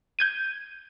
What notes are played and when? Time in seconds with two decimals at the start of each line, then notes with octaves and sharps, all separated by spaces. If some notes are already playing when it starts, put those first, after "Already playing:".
0.19 G6 G#6 D#7